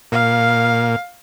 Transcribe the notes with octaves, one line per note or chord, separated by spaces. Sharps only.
A#2 F5